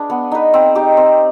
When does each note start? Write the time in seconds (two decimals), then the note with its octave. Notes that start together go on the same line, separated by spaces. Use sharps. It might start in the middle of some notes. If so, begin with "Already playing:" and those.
Already playing: D4 G#4 B4 F5
0.10 B3
0.32 D#4 B4
0.54 C4
0.75 D#4 G4
0.97 C4